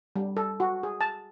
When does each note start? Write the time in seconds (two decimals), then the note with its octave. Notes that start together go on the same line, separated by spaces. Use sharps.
0.16 G3
0.37 A4
0.60 F#4
0.83 G#4
1.01 A5